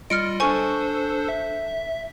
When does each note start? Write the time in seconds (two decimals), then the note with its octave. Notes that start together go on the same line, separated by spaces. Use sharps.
0.10 G3 F4 D#5 F6 C#7 D7
0.40 D4 A4 C5 G#5 C#6
1.29 E5